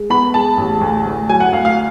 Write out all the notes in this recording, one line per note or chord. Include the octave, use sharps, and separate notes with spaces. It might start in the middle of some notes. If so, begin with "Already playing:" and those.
Already playing: G#3
B3 B5
G#3 A5
A1
D2
D2
F#3 G#5
F#5
D2 F5
F5